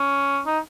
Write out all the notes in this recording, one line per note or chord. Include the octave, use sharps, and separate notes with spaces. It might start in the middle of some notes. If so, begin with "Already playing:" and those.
Already playing: C#4
D#4